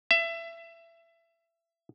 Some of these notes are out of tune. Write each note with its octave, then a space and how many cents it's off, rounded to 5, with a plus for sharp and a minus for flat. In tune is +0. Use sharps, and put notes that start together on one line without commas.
E5 +25